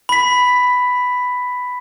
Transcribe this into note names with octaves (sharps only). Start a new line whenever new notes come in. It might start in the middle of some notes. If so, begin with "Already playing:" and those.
B5 B6